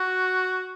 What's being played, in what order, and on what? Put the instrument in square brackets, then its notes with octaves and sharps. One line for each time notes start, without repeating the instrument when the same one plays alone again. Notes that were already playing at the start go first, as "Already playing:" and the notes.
Already playing: [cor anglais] F#4